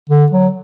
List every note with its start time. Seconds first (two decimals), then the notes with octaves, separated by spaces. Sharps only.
0.09 D3
0.32 F#3